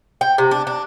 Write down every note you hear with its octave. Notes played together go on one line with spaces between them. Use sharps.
G5
C3
D4
D4